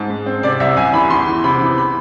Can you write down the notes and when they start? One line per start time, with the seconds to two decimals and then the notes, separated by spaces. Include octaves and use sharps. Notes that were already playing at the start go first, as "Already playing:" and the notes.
Already playing: G#2 G#3 A5
0.10 G#2
0.26 C4
0.43 C3 D5
0.60 C2 E5
0.77 C2 G#5
0.93 E3 B5
1.10 E2 C6
1.27 E3
1.44 C3 B5
1.61 E3
1.78 B5